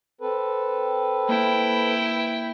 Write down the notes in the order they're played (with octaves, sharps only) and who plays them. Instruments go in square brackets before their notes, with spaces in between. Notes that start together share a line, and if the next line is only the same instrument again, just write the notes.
[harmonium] C4 A4 B4
[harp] A#3 [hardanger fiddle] E4 G5